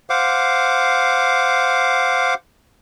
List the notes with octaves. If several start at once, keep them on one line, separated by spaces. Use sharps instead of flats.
C5 F5 F#5 D6